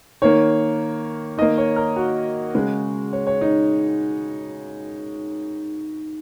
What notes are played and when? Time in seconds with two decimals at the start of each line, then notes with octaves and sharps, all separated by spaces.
0.22 D#3 A#3 C#5
1.37 D#3 A#3 D#5
1.58 C#5
1.76 A#4
1.96 F#4
2.54 C#3 G#3
3.13 C#5
3.27 C#5
3.41 D#4